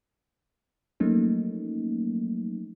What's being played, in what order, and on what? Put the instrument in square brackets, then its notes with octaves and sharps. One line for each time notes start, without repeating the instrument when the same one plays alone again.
[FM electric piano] F3 F#3 A3 A#3 C#4 D#4